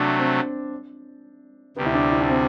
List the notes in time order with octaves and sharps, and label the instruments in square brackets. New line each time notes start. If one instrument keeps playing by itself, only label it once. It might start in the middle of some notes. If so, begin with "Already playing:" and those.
Already playing: [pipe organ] C3 F#3 A3 [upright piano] D4
[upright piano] C4
[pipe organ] D2 C3 G3 [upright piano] B3
[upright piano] E4
D4
E4
D4
C4